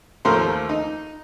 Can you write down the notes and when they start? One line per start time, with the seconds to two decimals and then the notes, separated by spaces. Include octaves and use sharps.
0.25 D#2 F3 A3 A#4 C6
0.69 D#4